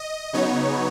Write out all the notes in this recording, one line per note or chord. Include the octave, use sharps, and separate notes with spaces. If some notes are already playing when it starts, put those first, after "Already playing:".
Already playing: D#5
C#3 F#3 B3 D#4 C#5